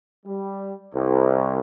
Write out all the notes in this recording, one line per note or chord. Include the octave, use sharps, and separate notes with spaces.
G3
C2